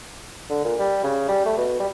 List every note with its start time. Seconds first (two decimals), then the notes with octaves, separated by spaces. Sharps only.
0.50 D3
0.64 A#2
0.79 G3
1.04 C#3
1.29 G3
1.46 A3
1.58 B2
1.79 G3